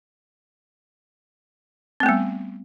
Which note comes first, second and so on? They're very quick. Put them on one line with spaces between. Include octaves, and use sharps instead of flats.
C4 A3 B3 G3